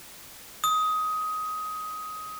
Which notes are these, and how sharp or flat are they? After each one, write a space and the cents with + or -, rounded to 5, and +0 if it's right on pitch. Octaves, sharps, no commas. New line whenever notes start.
D#6 +15